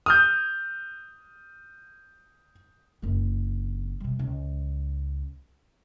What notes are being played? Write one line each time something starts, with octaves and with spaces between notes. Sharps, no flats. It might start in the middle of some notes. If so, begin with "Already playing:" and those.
D#6 F6 G6
F#1 C4
C3 G3
C#2